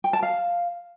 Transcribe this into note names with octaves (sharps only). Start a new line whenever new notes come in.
G5
A5
F5